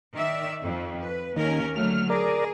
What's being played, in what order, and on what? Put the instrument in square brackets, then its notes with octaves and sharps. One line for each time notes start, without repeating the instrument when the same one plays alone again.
[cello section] D#3 D5 E5
F2
B4
[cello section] D#2 C#4 A#4 [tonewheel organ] D#3
[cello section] D3 F#3 A3 [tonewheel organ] F6
[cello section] G#4 [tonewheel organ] A#4 D5